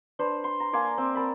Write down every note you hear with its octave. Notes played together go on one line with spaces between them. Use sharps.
D4 B4 C5
C6
A#5
A#3 G#5 C6 D6
C4
A#4 A5 B5